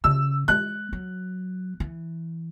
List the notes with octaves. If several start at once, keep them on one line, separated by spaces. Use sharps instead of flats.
C#3 E6
G#3 F#6
F#3
E3